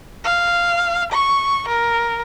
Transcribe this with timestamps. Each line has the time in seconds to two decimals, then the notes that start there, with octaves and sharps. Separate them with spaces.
0.24 F5
1.12 C#6
1.68 A#4